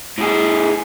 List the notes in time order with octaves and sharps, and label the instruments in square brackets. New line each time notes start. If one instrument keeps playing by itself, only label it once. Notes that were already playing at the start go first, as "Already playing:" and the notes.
[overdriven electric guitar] A2 G#4